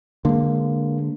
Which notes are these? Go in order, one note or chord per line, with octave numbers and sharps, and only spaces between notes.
D3 G#3 A#3